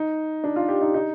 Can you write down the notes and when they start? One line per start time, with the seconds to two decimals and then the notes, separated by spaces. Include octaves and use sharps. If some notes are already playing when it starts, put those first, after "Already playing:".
Already playing: D#4
0.44 D4
0.56 F4
0.68 G4
0.81 D#4
0.94 D#4